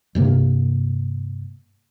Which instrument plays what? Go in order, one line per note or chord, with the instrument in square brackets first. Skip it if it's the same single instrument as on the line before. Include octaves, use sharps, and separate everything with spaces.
[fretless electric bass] G2 C3 A#3